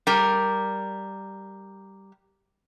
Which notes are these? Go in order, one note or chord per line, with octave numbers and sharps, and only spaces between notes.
G3 A#4